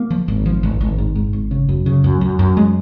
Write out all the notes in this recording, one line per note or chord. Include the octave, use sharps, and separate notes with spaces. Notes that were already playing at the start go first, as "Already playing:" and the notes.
Already playing: A#3
F3
G#1
F3
G#1
G#1
G#2
G#2
G#1
C#3
F#2
C#3
F#2
F#2
F#2
G#3